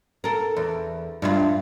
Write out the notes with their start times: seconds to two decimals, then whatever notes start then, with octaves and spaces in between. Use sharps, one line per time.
0.24 A4 A#4
0.57 E2
1.22 G2 E4 F4